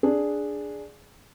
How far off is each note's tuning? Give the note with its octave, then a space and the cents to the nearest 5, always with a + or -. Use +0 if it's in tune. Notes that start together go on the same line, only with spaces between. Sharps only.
D4 +0 G#4 +0